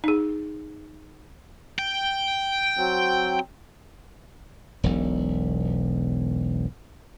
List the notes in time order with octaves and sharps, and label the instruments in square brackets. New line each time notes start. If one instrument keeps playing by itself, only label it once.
[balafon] D#4 G#4
[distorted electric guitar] G5
[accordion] F#3 C4
[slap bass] E1 B1